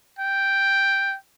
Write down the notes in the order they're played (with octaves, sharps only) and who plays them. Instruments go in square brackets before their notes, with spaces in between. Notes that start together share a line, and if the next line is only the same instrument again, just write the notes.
[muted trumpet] G5